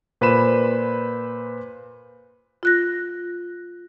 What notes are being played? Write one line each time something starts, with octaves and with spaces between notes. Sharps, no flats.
A#2 B4 C5 B5 E7
F4 F#6 A#6